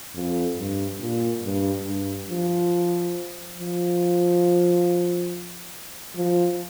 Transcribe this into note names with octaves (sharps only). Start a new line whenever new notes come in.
F2
G2
A#2
G2
G2
F3
F3
F3